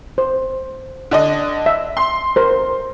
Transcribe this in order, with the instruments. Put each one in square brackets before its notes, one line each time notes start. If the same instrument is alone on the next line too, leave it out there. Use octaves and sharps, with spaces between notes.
[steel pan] C5
[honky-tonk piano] D3 D4 D#5
[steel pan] E5
[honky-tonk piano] C6
[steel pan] A#4 C5